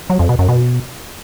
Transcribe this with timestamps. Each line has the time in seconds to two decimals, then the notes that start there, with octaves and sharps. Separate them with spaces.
0.10 F#3
0.19 F2
0.29 B2
0.39 F#2
0.49 B2